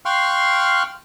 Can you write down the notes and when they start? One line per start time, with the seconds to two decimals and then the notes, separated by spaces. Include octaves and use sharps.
0.05 F5 G5 C6 C#6 F6 F#6